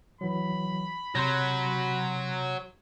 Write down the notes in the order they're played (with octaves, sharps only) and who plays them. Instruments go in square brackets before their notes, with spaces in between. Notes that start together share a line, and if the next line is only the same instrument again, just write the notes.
[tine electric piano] E3 F#3 [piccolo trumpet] B5
[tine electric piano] C3 [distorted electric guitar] F#3 [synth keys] C6 G6 A#6